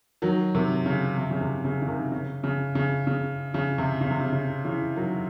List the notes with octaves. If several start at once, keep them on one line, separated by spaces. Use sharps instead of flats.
D#3 F#3
C3 D#3
C#3
C3
C#3
C3
C#3
C#3
C3 D#3
C#3
C#3
C#3
C#3
C#3
C3
C#3
C3
C#3
C#3
C#3 E3
D#3 F#3